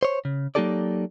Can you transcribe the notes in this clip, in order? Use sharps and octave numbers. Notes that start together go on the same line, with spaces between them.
C5 C#5
C#3
F#3 A#3 D#4 G4 A4 D5